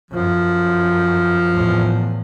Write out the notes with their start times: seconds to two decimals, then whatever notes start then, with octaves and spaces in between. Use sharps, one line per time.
0.10 F#2 F3
1.52 E2 A2